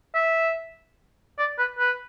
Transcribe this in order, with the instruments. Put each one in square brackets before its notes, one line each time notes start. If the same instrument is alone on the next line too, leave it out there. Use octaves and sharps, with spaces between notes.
[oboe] E5
D5
B4
B4